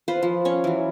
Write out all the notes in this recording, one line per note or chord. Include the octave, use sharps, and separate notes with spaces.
F4 B4 C5
F3
C#4 C#5
E3 F#3